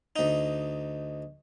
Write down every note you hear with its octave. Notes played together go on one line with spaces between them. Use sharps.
D2 D#4